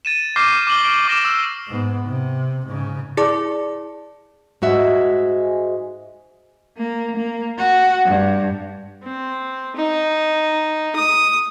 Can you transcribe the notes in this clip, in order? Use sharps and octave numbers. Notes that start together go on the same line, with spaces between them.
A6 D#7 E7
C#6 D6 F6 G6 A#6 C7
D6 F6 F#7 G7
D7
D6 F6 A#6 D7 E7
E6 F6
G#2 B3
C3
G#2 C#3
E4 G#4 D5 A5 D6
G#2 G#3 F#4 E5
A#3
A#3
F#4
G2
C4
D#4
D#6